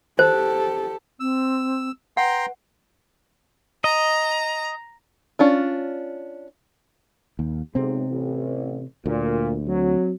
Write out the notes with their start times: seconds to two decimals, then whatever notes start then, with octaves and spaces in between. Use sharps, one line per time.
0.19 G4 A4 C5
1.20 C4 E6
2.17 B4 F#5 G5 A#5 C6
3.84 D#5 A#5
5.39 C#4 D4 F4
7.39 D#2
7.75 B1 G#2 C3 C4
8.09 A1
9.06 D2 A#2
9.67 F#3 C4